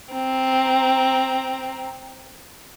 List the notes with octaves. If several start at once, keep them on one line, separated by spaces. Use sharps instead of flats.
C4 A#5